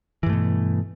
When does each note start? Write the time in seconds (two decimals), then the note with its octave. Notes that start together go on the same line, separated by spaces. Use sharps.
0.23 E3
0.26 G2
0.30 A3
0.33 B2